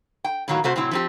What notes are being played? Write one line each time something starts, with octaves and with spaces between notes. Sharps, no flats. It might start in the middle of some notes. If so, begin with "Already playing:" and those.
G5
A2 D#3 F#3 A#3 F#4
C3 A3 F#4 C5
A2 C3 F#3 C4 E4
F3 C4 G4